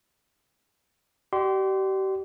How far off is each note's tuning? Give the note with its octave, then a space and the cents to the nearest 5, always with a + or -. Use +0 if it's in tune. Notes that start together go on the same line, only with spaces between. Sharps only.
G4 -35 D5 +30 C6 -15